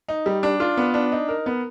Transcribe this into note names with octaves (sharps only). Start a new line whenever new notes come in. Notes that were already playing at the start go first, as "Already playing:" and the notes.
D#4
G3
D4
F4
B3
D4
D#4
A#4
B3